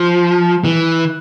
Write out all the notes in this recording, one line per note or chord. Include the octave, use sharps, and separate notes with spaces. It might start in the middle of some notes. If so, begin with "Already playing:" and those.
Already playing: F3
E3